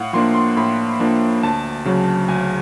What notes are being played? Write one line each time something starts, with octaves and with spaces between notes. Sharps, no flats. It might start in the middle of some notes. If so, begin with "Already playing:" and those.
Already playing: A2 F5 F#5
F3 A#3 D4 C6
C6
A2 B5
F3 A#3 D4
D2 A5
C#3 F#3
D2 G#5